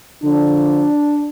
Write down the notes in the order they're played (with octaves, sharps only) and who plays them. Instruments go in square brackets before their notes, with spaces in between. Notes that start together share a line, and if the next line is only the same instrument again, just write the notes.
[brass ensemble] D3 F3 D4